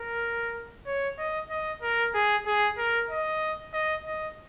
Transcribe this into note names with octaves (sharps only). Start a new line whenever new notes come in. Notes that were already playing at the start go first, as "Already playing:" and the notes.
Already playing: A#4
C#5
D#5
D#5
A#4
G#4
G#4
A#4
D#5
D#5
D#5